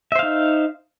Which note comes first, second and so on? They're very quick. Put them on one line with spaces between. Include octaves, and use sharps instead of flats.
E5 C5 F5 D#4